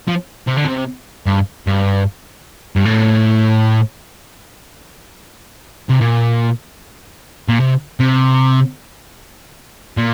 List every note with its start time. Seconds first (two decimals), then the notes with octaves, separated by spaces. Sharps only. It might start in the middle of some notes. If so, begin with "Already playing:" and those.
0.08 F3
0.48 C3
0.57 D3
0.65 C3
1.26 G2
1.67 G2
2.76 G2
2.85 A2
5.90 C3
6.01 A#2
7.48 A#2
7.60 C3
8.00 C3
9.97 A#2